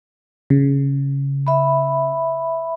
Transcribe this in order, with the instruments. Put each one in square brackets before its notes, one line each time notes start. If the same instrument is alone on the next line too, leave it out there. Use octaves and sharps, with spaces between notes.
[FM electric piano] C#3
[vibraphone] E5 B5